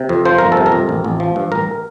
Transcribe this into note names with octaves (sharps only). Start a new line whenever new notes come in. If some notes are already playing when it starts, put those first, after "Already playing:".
Already playing: C3
F2
F3 C5
G1 A#4
A4
C3
A#4
F2
A1
A1
F3
G2
A1 A#4